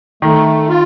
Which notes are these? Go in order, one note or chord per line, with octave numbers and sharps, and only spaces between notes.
D#3 A3
F4